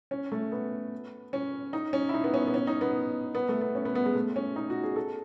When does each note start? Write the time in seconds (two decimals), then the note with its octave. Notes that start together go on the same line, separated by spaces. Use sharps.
0.11 C#4
0.32 A3
0.52 B3
1.33 C#4
1.73 D#4
1.93 C#4
2.09 E4
2.14 D#4
2.24 B3
2.34 C#4
2.47 B3
2.54 C#4
2.67 D#4
2.81 B3
3.35 B3
3.49 A3
3.61 B3
3.75 C#4
3.85 B3
3.95 B3
4.06 G#3
4.15 A3
4.36 C#4
4.56 D#4
4.70 F#4
4.83 G#4
4.96 A4